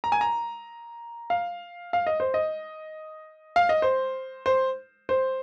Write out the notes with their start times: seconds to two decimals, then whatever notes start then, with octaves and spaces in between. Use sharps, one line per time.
0.04 A#5
0.12 G#5
0.21 A#5
1.30 F5
1.93 F5
2.07 D#5
2.20 C5
2.34 D#5
3.56 F5
3.69 D#5
3.82 C5
4.46 C5
5.09 C5